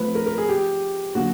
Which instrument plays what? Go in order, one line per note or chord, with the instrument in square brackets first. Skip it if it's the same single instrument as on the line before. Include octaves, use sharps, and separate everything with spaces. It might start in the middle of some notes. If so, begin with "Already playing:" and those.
Already playing: [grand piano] F3 A3 C4 [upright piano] B4
[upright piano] A#4
A#4
G#4
G4
[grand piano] D3 F#3 A#3 [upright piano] F#4